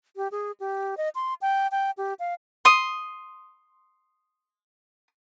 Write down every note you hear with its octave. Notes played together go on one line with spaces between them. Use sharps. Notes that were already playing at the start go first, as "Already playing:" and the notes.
G4
G#4
G4
D#5
C6
G5
G5
G4
F5
C6 D#6